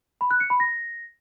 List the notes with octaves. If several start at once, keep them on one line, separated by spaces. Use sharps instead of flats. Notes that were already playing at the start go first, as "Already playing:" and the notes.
B5
F#6
C#7
B5
A#6